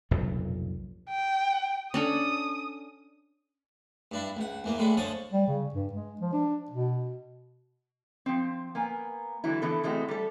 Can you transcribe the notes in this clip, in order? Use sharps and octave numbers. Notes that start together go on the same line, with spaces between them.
F1 B1 G2 A#2
G5
C#4 D4 A4 D#6
G2 D4 E4
C#2 F#5
E2 E3 A#3
A2 D3 G#3 E4
D3 F3 C#5 A5 D6 D#6
G3
C#3
G2
G#3
F3
D4
B2
F3 C4
A#3 B3 G#5
D3 E3 F#3 E4
D3 E3 B3 A4
E3 G#3 A3 C4 F#4
G3 A4